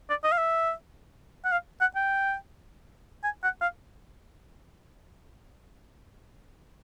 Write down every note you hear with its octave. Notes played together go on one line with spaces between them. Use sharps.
D5
D#5
F5
E5
F#5
F5
F#5
G5
G#5
F#5
F5